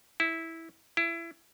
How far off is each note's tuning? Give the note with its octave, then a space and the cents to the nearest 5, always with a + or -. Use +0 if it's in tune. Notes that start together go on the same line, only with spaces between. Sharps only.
E4 -10
E4 +25